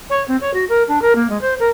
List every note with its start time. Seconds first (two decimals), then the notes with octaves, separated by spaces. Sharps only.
0.10 C#5
0.27 C4
0.40 C#5
0.53 F#4
0.69 A#4
0.88 D4
1.01 A#4
1.15 A#3
1.29 G#3
1.41 C5
1.59 A#4